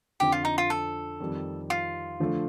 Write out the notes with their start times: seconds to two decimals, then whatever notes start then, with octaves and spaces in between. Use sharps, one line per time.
0.20 F2 D3 F3 G4
0.32 F4
0.45 D#4
0.58 F4
0.70 A4
1.20 F2 D#3 G3
1.70 F4
2.20 D3 F3 A3